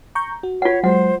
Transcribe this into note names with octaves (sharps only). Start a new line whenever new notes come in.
A#5 C#6 G6
F#4
F4 C#5 F#5
F#3 G#3 C5 F#5